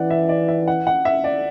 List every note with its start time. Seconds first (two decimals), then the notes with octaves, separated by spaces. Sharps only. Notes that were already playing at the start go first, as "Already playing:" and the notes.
Already playing: E3 D5 F#5
0.10 E5
0.29 D5
0.48 E5
0.68 F#5
0.87 F#5
1.05 E5
1.24 D5